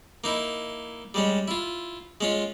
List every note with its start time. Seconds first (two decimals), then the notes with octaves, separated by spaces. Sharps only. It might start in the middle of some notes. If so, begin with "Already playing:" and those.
0.24 A#3 D#4 E4
1.14 G3 G#3 C#4
1.48 E4 F4
2.21 G#3 C#4 F4